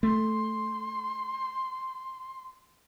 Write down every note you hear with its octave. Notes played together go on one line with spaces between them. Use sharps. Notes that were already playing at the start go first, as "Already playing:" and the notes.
A3 C6